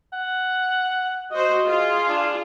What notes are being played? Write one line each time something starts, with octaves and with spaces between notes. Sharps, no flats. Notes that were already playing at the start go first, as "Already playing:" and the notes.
F#5
F#4 C5 D#5
F4 G#4
D4